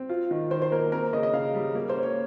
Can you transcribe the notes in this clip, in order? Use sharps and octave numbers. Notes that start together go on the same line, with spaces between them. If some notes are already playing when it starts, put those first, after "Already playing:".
Already playing: C4
F4
D#3
D#3 C5
C5
A#3 A#4
C4 A#4
C#3 D#5
D#5
C#3 F5
G3
A#3
C5
C#4
C#5